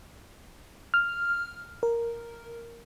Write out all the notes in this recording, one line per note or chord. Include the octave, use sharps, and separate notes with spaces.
F6
A#4